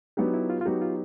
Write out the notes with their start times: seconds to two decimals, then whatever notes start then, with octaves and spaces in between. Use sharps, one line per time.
0.17 F#3 B3 D4 D#4 G4
0.34 E4
0.50 F4
0.61 F4
0.65 F#3 B3 D#4 F#4 G4
0.82 F4